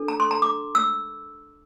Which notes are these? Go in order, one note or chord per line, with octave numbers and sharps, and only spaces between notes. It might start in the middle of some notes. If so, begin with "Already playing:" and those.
Already playing: D4 A4
A#5
C6
A#5
D6
E6